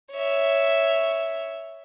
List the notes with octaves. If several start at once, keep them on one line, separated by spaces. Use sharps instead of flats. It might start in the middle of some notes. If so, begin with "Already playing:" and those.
C#5 E5